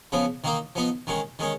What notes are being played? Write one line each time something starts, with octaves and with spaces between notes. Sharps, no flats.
C#3 F3 B3
D#3 A#3 D#4
F3 B3 D#4
D#3 G#3 C#4
D#3 G#3 C#4